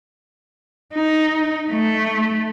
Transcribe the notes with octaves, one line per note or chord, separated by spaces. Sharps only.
D#4
A3